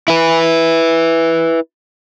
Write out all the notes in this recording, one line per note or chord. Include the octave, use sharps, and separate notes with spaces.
E4 B4